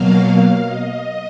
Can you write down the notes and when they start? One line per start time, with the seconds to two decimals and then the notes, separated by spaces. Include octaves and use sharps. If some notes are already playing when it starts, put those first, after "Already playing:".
Already playing: B2 F#3 A#3 F5
0.65 D#5